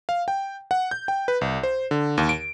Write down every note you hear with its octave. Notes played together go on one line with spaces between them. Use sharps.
F5
G5
F#5
G6
G5
B4
C2
C5
D3
D#2
D7